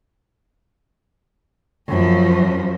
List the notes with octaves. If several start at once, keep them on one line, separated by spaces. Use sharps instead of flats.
F#2 F3